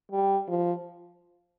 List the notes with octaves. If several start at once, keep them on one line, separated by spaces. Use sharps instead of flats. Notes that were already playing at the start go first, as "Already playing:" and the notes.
G3
F3